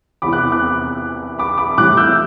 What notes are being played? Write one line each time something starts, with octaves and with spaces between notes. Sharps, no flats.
E2 C3 E3 B5 D6
D6 F#6
D6 F#6
B5 D6
B5 D6
A2 E3 G3 D6 F#6
E6 G6